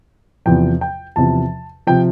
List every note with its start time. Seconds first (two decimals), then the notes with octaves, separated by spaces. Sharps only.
0.46 E2 C3 F3 G5
0.81 G5
1.16 E2 C3 F3 A5
1.87 C3 F3 G5